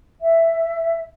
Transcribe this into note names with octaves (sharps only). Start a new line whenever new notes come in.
E5